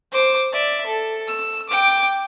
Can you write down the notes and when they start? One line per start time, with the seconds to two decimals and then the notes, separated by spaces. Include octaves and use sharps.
0.12 C5 D6
0.53 D5 E5
0.87 A4
1.28 E6
1.69 G5 D6